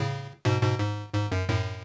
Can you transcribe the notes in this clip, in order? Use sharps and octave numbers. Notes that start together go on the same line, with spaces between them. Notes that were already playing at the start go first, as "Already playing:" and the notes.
Already playing: A2 C#3
G#2 B2
G#2 B2
G#2
G#2
F#2
F#2 A2